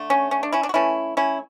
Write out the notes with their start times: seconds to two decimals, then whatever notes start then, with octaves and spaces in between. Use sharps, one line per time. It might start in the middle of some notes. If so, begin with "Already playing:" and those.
Already playing: D3 A3
0.10 C#4
0.31 C#4
0.43 D4
0.52 C#4 E4
0.63 D4
0.69 F#4
0.74 E3 A3 C#4 E4
1.17 C#4 E4